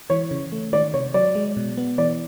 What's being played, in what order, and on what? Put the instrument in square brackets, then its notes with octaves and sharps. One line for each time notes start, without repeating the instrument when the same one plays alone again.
[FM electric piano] E3 [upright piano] C#5
[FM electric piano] C#3
A3
[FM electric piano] D#3 [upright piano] D5
[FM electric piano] C3 [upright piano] C#5
[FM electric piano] F#3 [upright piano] D5
[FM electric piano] G#3
B2
B3
[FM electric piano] E3 [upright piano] D5